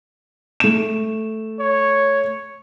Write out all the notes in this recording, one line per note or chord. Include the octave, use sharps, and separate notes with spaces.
A3 E7
C#5